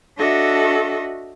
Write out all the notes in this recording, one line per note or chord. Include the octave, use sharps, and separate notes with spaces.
D4 F#4 A4 D#5 E5